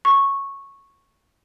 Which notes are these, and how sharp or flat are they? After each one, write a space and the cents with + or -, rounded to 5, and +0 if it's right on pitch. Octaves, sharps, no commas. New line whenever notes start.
C#6 -10